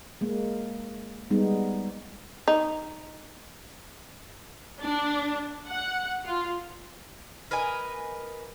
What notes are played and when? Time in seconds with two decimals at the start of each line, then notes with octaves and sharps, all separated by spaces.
0.21 G#3 A#3
1.30 G3 G#3 B3 D#4
2.48 D#4
4.80 D4
5.68 F#5
6.26 F4
7.51 A#4 B4 D#5 G#5